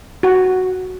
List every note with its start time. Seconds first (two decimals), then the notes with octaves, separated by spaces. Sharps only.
0.23 F#4